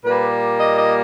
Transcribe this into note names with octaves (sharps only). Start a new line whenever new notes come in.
A#2 G3 A#3 B4
D#5
D#5